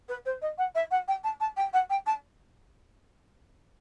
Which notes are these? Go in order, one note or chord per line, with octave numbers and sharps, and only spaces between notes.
B4
C5
D#5
F#5
E5
F#5
G5
A5
A5
G5
F#5
G5
A5